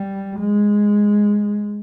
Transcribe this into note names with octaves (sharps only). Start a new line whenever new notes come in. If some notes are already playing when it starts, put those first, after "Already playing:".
Already playing: G3
G#3